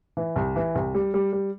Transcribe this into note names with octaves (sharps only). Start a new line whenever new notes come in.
E3
C2
E3
C2
G3
G3
G3